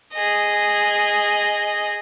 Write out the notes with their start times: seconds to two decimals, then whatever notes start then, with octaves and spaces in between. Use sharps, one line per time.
0.13 G#4 D#5